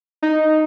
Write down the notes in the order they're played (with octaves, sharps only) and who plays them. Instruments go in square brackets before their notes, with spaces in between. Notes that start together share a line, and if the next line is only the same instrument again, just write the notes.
[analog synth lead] D#4